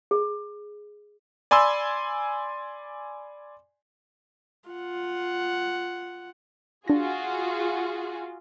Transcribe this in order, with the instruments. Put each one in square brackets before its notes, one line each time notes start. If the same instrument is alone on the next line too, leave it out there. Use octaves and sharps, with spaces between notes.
[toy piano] G#4
[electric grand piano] D5 G#5 B5 C6 E6
[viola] F4 F#5
[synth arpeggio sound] D4 A#6 [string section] F4 F#4 G#4